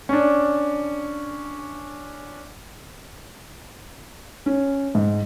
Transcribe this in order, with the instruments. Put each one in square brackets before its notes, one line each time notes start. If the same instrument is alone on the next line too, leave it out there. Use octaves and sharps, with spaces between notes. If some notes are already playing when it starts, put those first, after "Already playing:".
[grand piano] C#4 D4
[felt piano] C#4
G#2